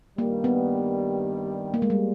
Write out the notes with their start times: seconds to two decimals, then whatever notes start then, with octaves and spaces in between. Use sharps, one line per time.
0.18 G2 D#3 G3 A#3
0.44 B3
1.74 A#3
1.82 G#3
1.90 G3